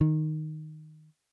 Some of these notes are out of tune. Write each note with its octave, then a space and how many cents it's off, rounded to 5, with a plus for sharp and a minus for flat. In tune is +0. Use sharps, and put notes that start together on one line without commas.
D#3 -5